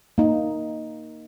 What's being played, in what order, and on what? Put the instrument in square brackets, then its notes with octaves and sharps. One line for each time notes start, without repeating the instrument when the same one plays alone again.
[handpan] A#3 D#4